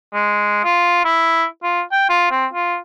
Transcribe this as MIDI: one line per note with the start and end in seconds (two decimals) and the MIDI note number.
0.14 0.60 56
0.64 1.03 65
1.04 1.45 64
1.63 1.82 65
1.92 2.06 79
2.09 2.29 65
2.31 2.46 60
2.53 2.77 65